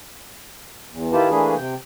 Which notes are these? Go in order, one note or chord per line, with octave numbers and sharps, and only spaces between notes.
E2
D#3 E4 F4 G4 B4 A5
E3 A3 A#3 D4 G#4 B4
C3 G5